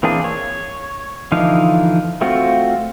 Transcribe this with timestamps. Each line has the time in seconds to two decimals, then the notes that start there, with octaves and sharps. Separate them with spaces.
0.03 E3 A#3 C4 D4 G#4
0.24 C#5
1.32 D3 E3 F3 D#4 F5
2.21 A3 C4 F4 F#4